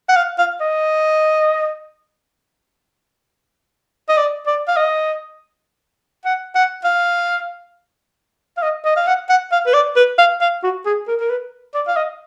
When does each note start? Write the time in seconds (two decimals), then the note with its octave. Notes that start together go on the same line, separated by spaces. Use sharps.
0.09 F#5
0.16 F5
0.38 F5
0.61 D#5
4.09 D#5
4.17 D5
4.47 D5
4.68 F5
4.77 D#5
6.25 F#5
6.55 F#5
6.84 F5
8.57 F5
8.62 D#5
8.85 D#5
8.96 F5
9.07 F#5
9.29 F#5
9.52 F5
9.66 B4
9.74 D5
9.96 B4
10.18 F5
10.41 F5
10.64 F#4
10.86 G#4
11.08 A#4
11.20 A#4
11.30 B4
11.75 D5
11.88 F5
11.97 D#5